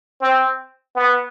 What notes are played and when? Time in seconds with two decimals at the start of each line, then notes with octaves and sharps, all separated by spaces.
0.20 C4
0.95 B3